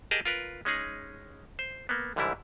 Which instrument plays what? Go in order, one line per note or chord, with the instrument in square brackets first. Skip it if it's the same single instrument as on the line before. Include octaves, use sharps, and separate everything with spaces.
[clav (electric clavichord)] G4 G#4 A#4 D#5 A5
F4 A#4 B4
G#3 C#4 D#4 G#4
C5
A#3 B3
C2 G#2 D3 E3 G3 E4